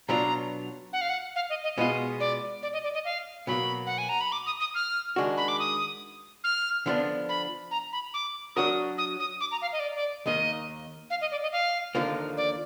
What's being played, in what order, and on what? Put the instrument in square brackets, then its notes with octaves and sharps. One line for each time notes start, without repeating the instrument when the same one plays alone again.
[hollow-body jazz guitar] B2 F#3 B3 D4 F4 [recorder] A#5
[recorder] F#5
F5
F#5
F5
D#5
D#5
[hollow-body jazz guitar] B2 G#3 B3 F4 [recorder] D#5
[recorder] D5
D5
D#5
D5
D#5
F5
[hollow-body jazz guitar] B2 F#3 A#3 [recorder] B5
[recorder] F#5
G#5
A#5
B5
D6
D#6
D#6
F6
[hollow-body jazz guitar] D#3 G#3 D4 F#4
[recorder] B5
D6
D#6
F6
[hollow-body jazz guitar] D3 F3 B3 D4
[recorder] B5
A#5
B5
D6
[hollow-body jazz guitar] F#3 D4 F#4 A#4 [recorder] D#6
[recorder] D#6
D#6
D6
A#5
F5
D#5
D5
D5
[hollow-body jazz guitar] D#2 D#3 A#3 [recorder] D#5
[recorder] F5
D#5
D5
D#5
F5
[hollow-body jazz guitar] D#2 D3 F3 A#3 F4
[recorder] D5